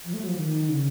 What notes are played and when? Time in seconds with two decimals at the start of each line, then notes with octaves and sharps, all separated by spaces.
0.05 F3
0.14 A3
0.22 F#3
0.28 F3
0.36 D#3
0.69 C#3